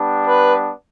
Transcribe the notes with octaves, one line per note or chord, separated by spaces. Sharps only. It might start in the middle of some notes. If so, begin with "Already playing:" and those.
Already playing: G3 B3 D4
B4